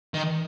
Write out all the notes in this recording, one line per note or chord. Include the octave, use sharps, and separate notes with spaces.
D#3